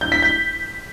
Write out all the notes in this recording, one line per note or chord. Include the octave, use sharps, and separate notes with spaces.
G6
B6
G6